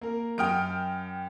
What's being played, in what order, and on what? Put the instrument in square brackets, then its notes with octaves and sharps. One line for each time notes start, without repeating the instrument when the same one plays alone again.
[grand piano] A#3 A#4
[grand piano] F#2 D#6 [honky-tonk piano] G5 F6 D7